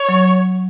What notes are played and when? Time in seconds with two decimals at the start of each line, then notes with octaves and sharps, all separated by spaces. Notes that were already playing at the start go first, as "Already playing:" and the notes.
Already playing: C#5
0.09 F#3